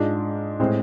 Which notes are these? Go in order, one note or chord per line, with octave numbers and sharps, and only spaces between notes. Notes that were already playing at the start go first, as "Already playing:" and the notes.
Already playing: G#2 G#3 D4 F4
A2 G#3 C4